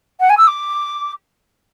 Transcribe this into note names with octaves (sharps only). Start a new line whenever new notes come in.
F#5
G#5
E6
D6